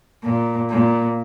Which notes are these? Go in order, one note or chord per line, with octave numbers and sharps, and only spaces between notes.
A#2
A#2